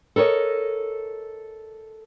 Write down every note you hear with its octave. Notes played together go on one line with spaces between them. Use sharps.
A4 A#4 C5 C#5 D#5